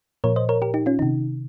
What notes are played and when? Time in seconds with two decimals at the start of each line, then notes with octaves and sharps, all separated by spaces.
0.24 A#2 F3 A#4 C#5
0.36 C5 D#5
0.49 A#4 C#5
0.62 G4 A#4
0.74 D#4 G4
0.86 C#4 F4
0.99 C3 D#3 D#4